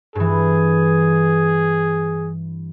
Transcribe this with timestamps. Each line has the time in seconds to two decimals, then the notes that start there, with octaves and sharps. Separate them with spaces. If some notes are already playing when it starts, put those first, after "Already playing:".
0.15 G2 E3 G#4